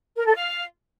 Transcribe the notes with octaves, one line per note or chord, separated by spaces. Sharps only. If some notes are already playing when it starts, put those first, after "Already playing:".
A#4
A4
F5